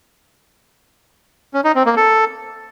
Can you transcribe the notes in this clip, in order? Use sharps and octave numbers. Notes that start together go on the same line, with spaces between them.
C#4
D#4
C4
A#3
A4